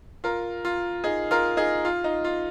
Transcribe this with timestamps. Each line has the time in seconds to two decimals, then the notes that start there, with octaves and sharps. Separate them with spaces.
0.24 F4 A#4
0.65 F4
1.04 D#4 G#4
1.31 F4 A#4
1.57 D#4 G#4
1.85 F4
2.04 D#4
2.25 F4